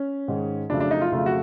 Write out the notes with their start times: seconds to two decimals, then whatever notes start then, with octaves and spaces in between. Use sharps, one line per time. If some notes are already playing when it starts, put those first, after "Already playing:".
Already playing: C#4
0.28 G#2 D#3 G#3
0.70 F2 C#3 F#3 A3 D4
0.80 D4
0.91 D#4
1.01 F4
1.12 F2 C#3 F#3 A3 F4
1.26 F#4